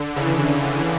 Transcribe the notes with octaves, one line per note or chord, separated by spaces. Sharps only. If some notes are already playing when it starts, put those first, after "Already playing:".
Already playing: D3
C#3 E3